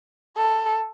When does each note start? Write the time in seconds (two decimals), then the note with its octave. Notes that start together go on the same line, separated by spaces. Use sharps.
0.37 A4